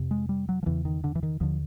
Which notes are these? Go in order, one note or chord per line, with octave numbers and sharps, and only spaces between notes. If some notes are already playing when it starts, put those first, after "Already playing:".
Already playing: F2 C3
G#3
G3
F#3
F3
E2 C#3 E3
D#3
D3
E3
D#3
D#2 D3 F3